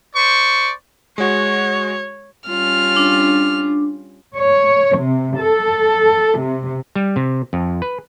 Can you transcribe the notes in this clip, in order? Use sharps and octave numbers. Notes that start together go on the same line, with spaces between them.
C5 D5 C#6
G#3 F#4 C#5
G3 C#4 F4 F6
D4
C#5
C3
A4
C3
G3
C3
F2
B4